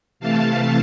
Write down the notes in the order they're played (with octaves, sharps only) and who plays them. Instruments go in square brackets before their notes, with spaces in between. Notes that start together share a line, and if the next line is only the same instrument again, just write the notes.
[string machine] C3 E3 A3 F5 A5